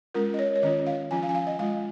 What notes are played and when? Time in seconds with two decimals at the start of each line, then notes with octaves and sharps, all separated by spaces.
0.14 G#3 C#4 F4 A#4
0.34 D#5
0.39 C#5
0.55 C#5
0.63 D#3 C#4 F4 D#5
0.87 F5
1.11 F3 C#4 F4 G#5
1.23 F5
1.29 G#5
1.35 F5
1.47 D#5
1.59 G#3 F4 F5